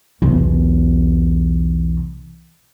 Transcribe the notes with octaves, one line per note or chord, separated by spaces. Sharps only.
B1 E2